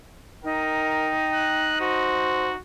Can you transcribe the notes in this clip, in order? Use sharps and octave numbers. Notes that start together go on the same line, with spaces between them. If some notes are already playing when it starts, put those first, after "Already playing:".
D#4 A#4 G5
F#6
F#4 C5